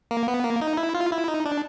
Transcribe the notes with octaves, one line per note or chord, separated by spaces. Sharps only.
A#3
B3
A#3
D#4
E4
F4
E4
D#4
D4